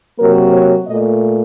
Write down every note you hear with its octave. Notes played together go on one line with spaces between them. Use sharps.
C3 F#3 A#3 A#4
C#5
A#2 A3 D#5